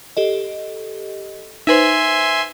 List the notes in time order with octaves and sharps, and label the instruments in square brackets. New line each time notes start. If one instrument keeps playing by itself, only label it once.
[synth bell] G4 A4 D#5
[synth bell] D#4 B4 C5 [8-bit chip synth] E5 G#5 C6